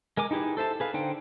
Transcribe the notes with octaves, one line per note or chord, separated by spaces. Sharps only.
G#3 A#4 G#5 D6
D#4 E4 G4 G#4 B4
A4 C5 E5 A5
G#4 B4 F5
D3 D#4 C5 G5